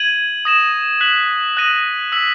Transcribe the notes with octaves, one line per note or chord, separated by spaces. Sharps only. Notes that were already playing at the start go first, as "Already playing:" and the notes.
Already playing: G#6 D#7 F#7
D#6 A#6 E7
F#6 B6 F#7
D#6 F#6 A#6 D#7 F#7
E6 B6 F#7